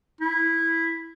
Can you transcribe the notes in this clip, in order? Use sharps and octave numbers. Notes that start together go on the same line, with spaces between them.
E4